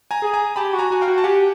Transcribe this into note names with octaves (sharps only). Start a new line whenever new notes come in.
G#5 A#5
G#4
G#5 A#5
G4 A5 B5
F#4
G#5 A#5
F#4 G#5
F5 G5
F#4
A5
G4 F#5 G#5